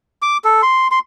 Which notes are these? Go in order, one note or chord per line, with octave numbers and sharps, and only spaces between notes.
D6
A4
C6
C6